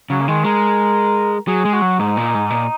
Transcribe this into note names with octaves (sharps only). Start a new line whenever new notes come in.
C#3 F#3
A#3
D#3 G#3
G#3 A#4
F#3 G#4
G#3
F#4
F#3
G#2 D#4
A#2
G#2
A#2